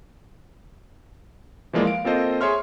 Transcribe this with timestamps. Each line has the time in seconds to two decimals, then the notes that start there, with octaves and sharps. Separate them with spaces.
1.73 E3 F3 G#3 A#3 D5
1.85 F5 D7
2.04 A#3 C4 F4 A4 C5 D#5
2.41 G#4 C#5 E5 C6 F6